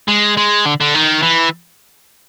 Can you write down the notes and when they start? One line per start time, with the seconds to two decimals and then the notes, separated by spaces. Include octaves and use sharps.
0.08 G#3
0.37 G#3
0.66 D3
0.81 D3
0.94 D#3
1.22 E3